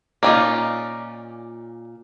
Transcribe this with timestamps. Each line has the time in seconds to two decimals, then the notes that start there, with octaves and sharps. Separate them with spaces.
0.23 A#2 A#3 C#4 D#4 F4 D5